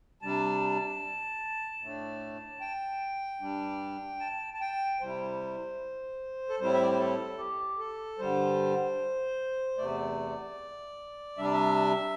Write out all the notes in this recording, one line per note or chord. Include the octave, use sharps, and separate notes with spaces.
C3 G3 D4 A5
A2 A3 D4
G5
G2 G3 D4
A5
A5
G5
C3 G3 E4 C5
A4
A2 G3 C4 E4 C5
E5
D5
C5
A4
G4
A4
G2 D3 G3 C5
E2 C3 A3 D5
C3 G3 D4 E5
D5
E5